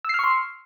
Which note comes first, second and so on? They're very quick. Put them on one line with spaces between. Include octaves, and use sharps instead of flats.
E6 C7 F6 C#6 C6